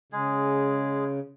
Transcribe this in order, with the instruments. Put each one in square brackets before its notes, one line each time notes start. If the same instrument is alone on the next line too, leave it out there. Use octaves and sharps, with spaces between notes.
[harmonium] C#3 [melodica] G#3 G#4